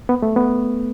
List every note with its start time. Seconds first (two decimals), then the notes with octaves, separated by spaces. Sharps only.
0.09 B3
0.22 A3
0.36 B3